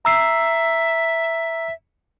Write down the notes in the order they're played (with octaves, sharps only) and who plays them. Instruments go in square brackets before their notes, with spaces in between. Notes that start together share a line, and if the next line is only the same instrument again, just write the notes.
[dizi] E5 [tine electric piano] A#5 E6 C7